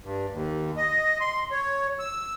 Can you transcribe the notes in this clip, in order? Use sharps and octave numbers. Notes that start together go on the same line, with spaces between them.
G2
D#2
D#5
C6
C#5
E6